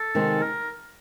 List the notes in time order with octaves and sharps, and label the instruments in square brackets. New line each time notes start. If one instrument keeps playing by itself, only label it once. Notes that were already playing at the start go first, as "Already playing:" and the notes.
Already playing: [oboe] A4
[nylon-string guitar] C3 D#3 G#3 C4
[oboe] A#4